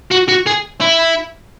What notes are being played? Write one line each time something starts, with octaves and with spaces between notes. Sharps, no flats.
F#4
F#4
G#4
E4